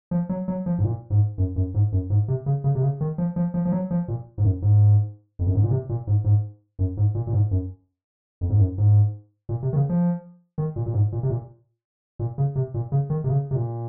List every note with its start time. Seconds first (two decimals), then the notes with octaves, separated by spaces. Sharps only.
0.11 F3
0.29 F#3
0.48 F#3
0.66 F3
0.78 G#2
0.84 A#2
1.10 G#2
1.38 F#2
1.56 F#2
1.74 G#2
1.92 F#2
2.10 G#2
2.28 C3
2.46 C#3
2.64 C#3
2.75 C3
2.82 C#3
3.01 D#3
3.18 F3
3.36 F3
3.54 F3
3.65 F3
3.72 F#3
3.91 F3
4.08 A#2
4.38 G#2
4.44 F#2
4.62 G#2
5.39 F2
5.47 F#2
5.55 G#2
5.63 A#2
5.71 C3
5.89 A#2
6.07 G#2
6.24 G#2
6.79 F#2
6.97 G#2
7.15 A#2
7.27 A#2
7.33 G#2
7.51 F#2
8.41 F2
8.50 G#2
8.59 F#2
8.78 G#2
9.49 A#2
9.63 C3
9.73 D#3
9.76 C#3
9.89 F3
10.58 D#3
10.76 A#2
10.86 A#2
10.94 G#2
11.12 A#2
11.23 C3
11.30 A#2
12.19 A#2
12.38 C#3
12.56 C3
12.74 A#2
12.92 C#3
13.10 D#3
13.24 C3
13.29 C#3
13.51 C3
13.55 A#2